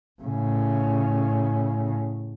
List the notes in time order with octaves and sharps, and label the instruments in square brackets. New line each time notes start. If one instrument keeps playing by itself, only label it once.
[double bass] A2 C#3